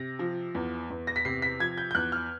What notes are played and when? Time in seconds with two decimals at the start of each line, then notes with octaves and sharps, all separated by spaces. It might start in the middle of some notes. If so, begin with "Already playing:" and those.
Already playing: C3 A#6
0.19 F3
0.55 E2
0.90 E2
1.07 A#6
1.16 B6
1.25 C3 C7
1.42 B6
1.60 F3 G#6
1.78 G6
1.91 G6
1.95 E2 F#6
2.12 F6